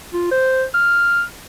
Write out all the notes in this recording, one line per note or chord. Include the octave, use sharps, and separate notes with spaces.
F4
C5
F6